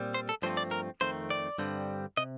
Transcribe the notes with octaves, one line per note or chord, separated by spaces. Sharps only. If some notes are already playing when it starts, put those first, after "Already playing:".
Already playing: A#2 G3 C4
C5
A4
G2 F3 A3 C4 C5
D5
A#4
F2 D#3 A3 C4 C5
D5
G2 D3 G3 C4
C3 D#5